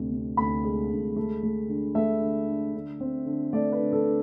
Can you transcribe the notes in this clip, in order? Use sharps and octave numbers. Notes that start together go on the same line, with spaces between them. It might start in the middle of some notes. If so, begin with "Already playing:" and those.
Already playing: D2 C3
C3
D2 B5
G#3
D2
A3
A3
D3
A3 E5
D3
D3
D3
C4
D3
A3 D5
B4
D3
A4
D3